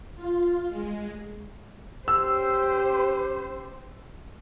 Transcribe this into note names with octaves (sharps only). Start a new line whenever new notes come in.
F4
G#3
C#4 G4 C5 E6